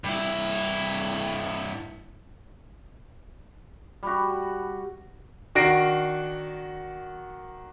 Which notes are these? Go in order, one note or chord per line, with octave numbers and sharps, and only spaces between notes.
G2 E4
G3 F#4
D#3 D4 F#4 A#6 C7 D7